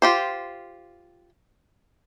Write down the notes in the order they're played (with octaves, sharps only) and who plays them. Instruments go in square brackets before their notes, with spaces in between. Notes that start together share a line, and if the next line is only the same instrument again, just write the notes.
[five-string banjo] F4 G4 C5